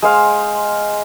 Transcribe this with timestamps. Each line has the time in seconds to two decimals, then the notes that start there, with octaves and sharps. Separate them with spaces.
0.02 G#3 C5 F5